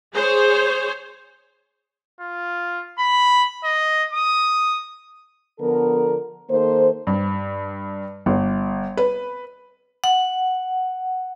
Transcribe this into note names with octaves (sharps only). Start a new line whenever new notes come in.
G#4 C5 C#5
F4
B5
D#5
D#6
D3 F3 B3 A4 A#4
D#3 A#3 A4 C5
G2
G1
B4
F#5